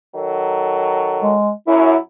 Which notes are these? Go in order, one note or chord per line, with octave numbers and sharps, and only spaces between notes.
D#3 F#3 A4
G#3
F#2 E4